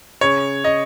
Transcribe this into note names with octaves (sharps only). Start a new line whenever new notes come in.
C#3 C#5
D#5